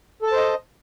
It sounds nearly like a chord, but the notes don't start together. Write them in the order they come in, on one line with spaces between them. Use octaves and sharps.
A4 A5 C5 D#5